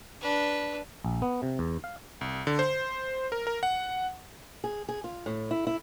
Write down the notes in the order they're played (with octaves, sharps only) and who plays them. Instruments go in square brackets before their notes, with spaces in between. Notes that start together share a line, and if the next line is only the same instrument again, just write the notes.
[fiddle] D4 B4
[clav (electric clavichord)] A#1
B3
C3
E2
F5
[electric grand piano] C2
D3
C5
A#4
A#4
F#5
[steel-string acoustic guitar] G#4
G#4
F4
A2
E4
E4